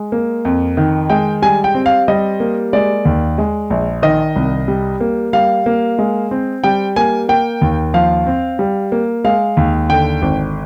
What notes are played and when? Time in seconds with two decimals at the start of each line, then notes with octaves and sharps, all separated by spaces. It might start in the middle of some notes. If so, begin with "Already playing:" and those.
Already playing: G#3
0.12 A#3
0.45 F2
0.77 D#3
1.10 G#3 G5
1.42 G3 G#5
1.64 G5
1.75 C4
1.86 F5
2.08 G3 D#5
2.40 A#3
2.73 G#3 D5
3.05 D#2
3.38 G#3
3.70 A#1
4.02 D#3 D#5
4.36 C2
4.68 G3
5.01 A#3
5.33 G3 F5
5.66 A#3
5.99 G#3
6.31 C4
6.64 G3 G5
6.96 A#3 G#5
7.29 A#3 G5
7.61 D#2
7.94 F3 F5
8.27 C4
8.59 G3
8.92 A#3
9.24 G#3 F5
9.57 D#2
9.89 D3 G5
10.22 G#1